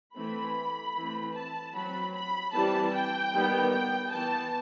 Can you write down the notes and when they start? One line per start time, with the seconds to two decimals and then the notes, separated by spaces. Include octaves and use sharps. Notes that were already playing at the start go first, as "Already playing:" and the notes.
0.16 E3 A3 C4 B5
0.96 E3 A3 C4
1.34 A5
1.74 F#3 C4 B5
2.14 B5
2.53 E3 G3 C4 A5
2.93 G5
3.33 D#3 G3 B3
3.72 G5
4.12 E3 B3 A5